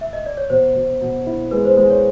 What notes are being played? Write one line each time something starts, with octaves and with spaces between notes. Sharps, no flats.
E5
D#5
D5
C#5
B2 C5
B2
B2
E4
G#3 B4
C5
G#3 C5
C#5